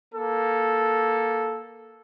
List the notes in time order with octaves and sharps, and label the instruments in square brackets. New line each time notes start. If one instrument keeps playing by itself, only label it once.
[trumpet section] A#3 A4